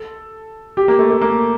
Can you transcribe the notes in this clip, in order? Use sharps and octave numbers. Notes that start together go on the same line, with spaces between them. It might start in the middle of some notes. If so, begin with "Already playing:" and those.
Already playing: A4
G4
A#3
A3
A3
A#3